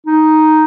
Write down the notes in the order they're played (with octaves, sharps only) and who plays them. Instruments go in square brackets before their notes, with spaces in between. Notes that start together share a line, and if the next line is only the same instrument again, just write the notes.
[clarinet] D#4